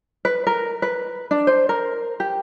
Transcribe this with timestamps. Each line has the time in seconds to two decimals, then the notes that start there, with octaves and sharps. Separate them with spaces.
0.25 B4
0.47 A#4
0.82 B4
1.31 D4
1.47 C5
1.69 A#4
2.20 G4